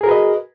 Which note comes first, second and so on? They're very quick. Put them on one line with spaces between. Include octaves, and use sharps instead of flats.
G#4 A#4 F#4 B4 D#5